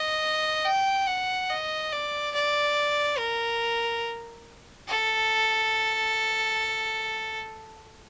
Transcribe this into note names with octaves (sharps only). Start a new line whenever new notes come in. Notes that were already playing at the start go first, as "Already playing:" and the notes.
Already playing: D#5
G5
F#5
D#5
D5
D5
A#4
A4